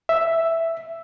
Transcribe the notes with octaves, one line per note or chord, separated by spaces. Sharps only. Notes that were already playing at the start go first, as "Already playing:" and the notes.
E5